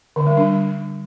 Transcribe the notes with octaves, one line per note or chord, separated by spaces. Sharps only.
D3
G3
D4